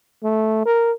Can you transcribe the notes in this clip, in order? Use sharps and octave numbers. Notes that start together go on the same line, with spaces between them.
A3
A#4